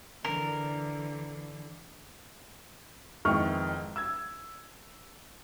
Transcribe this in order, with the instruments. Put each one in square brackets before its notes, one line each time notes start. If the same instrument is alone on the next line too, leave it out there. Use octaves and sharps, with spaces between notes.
[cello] D3 E3 [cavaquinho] A#4
[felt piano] F2 G#2 D#3 E3 C#6 F6
E6 G#6